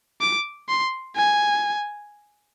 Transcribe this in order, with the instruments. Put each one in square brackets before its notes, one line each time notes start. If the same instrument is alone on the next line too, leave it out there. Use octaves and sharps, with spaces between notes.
[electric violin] D6
C6
G#5